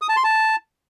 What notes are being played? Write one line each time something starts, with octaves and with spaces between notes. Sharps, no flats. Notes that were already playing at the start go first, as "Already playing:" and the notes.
D#6
A5
C6
A5